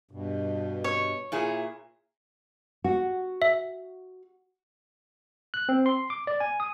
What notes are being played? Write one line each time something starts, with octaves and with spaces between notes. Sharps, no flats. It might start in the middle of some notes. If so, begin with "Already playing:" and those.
G2 B2
C#5
A#2 E4 G#4
F#4
E5
F#6
C4
C6
D6
D5
G#5
D#6